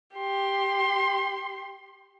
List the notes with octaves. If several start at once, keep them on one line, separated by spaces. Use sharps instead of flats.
G4 C6